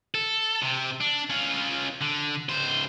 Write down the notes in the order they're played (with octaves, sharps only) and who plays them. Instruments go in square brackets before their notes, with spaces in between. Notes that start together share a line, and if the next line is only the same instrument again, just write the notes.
[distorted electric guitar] A4
C3
D4
C#4 F4
D3
C#2 C5